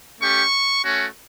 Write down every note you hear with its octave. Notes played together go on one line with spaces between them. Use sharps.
A3 C#4 G4 C#6
A3 C#4 F#4